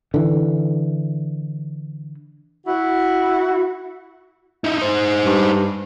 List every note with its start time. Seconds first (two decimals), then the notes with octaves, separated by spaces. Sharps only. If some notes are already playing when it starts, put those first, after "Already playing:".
0.14 D3 E3
2.67 E4 F#4
4.64 D#4 E4
4.78 D#4 C5
5.26 G2